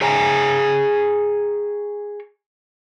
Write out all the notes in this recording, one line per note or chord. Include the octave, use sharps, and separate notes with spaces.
G#4 C#5 G5 G#5 A#5